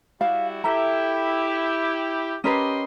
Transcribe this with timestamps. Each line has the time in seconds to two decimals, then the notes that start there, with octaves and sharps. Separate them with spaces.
0.21 G3 E4 F#4 F5
0.64 E4 G4 A4 E5 A#5
2.44 C#4 G4 A#4 B4 D#5 C6